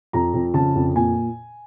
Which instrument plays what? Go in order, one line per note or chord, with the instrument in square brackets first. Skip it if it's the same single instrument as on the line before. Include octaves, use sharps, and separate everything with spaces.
[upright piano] F2 A#5
F2
C#3 A5
F2
A#2 G#5